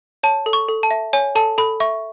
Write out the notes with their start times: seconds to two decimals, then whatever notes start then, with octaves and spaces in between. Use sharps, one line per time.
0.23 C#5 A5
0.46 A4
0.53 C#6
0.69 A4
0.83 A5
0.91 E5
1.13 C#5 G#5
1.35 A4 A5
1.58 A4 B5
1.80 E5 C#6